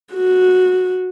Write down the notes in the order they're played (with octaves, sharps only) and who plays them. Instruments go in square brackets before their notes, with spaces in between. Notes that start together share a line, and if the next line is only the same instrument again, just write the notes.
[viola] F#4